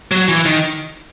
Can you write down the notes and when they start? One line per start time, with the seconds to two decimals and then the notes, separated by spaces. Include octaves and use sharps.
0.11 F#3
0.29 E3
0.46 D#3